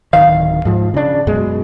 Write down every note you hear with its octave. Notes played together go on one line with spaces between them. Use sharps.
D1 D#3 F5
G#2 F3
C#3 D4
F#2 B2 G#3